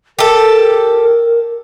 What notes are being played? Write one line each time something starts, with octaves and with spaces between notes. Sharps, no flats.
G4 A4 A#4